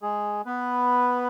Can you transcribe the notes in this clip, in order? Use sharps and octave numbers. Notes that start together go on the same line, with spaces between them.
G#3 G#4
B3 B4